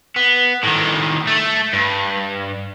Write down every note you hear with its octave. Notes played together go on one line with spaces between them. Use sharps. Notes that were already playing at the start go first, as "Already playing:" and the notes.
B3
A2 D#3
A3
G2